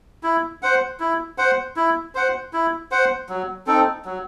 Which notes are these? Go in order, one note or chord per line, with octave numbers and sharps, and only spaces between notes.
E4
C5 F#5
E4
C5 F#5
E4
C5 F#5
E4
C5 F#5
F#3
C4 D#4 A4
F#3